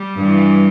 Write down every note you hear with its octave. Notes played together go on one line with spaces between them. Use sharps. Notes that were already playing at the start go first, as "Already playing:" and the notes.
Already playing: G3
G2 E3